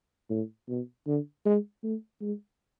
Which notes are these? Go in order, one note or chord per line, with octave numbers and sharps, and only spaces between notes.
A2
B2
D3
G#3
A3
G#3